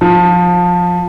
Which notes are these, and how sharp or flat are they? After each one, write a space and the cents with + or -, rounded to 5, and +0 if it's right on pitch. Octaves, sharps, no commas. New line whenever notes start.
F3 +20